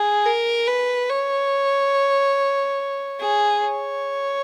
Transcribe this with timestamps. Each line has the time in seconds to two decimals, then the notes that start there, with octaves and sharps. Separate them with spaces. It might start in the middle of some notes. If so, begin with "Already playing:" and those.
Already playing: G#4
0.26 A#4
0.67 B4
1.10 C#5
3.20 G#4
3.62 C#5